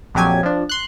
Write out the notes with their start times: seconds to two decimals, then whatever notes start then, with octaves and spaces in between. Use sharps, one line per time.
0.14 A#1 F2 F#3 G4 G#5 G#6
0.43 F3 D4
0.69 C6 F#6